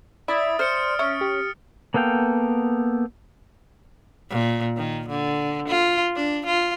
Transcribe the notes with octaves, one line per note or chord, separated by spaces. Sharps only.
E4 D5 D#6 A6 D7
C5 F6 C#7
C#4 E5
G4
A#3 B3 A4 F5 G5
A#2
D#3
D3
F4
D4
F4